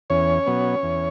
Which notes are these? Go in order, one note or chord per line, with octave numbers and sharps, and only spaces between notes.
E2 C#4 C#5
B2 F#3 B3
E2